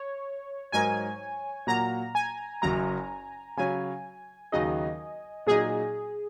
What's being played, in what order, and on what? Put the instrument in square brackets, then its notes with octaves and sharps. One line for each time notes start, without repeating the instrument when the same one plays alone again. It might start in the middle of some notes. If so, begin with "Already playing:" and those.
Already playing: [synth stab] C#5
[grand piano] G#2 F#3 D#4 A#4 [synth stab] G#5
[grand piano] A#2 F#3 A#3 F#4 [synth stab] A#5
[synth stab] G#5
[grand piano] F#1 F#2 F#3 [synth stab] A#5
[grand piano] C#3 F#3 C#4 [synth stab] G#5
[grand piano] D#2 C#3 F#3 D#4 G#4 [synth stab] D#5
[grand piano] A#2 F#3 D#4 [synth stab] G#4